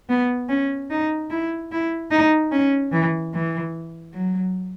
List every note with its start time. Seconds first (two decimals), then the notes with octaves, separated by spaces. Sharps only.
0.09 B3
0.49 C#4
0.90 D#4
1.30 E4
1.72 E4
2.11 D#4
2.51 C#4
2.92 E3
3.34 E3
4.13 F#3